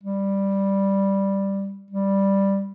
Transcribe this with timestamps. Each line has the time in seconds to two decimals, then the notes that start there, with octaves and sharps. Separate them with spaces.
0.03 G3
1.91 G3